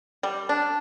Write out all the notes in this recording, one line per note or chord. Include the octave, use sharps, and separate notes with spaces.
G3
D4